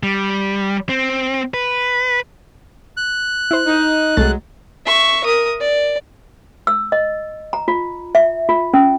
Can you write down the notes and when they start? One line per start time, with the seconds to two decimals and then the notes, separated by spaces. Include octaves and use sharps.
0.03 G3
0.89 C4
1.54 B4
2.97 F#6
3.51 E4 C5
3.66 D#4
4.17 C2 F#3 G#3 A3 A6
4.86 E5 C#6
5.25 A#4 D#6
5.61 D5
6.67 E6
6.92 D#5
7.53 A#5
7.68 F4
8.15 E5
8.49 F4
8.74 C#4